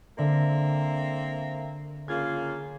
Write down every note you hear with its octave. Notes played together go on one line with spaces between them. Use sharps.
D3 A#3 C4 E5
C#3 A#3 F4 G#6